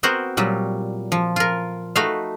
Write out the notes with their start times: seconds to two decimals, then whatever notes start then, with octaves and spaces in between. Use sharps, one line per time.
0.03 B3 C4 F#4 A#4 C5 F#5
0.37 A#2 F#3 G3
1.12 F3
1.36 F4 A#4
1.96 A3 D#4 F#4 B4 E5 F5